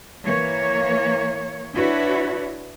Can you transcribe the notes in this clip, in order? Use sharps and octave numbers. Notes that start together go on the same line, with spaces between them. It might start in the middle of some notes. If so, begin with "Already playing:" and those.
E3 A#3 C#5
D4 E4 F#4 B4 C#5